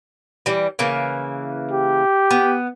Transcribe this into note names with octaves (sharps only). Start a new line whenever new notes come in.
E3 G3
C#3 E3 A#3
G4
B3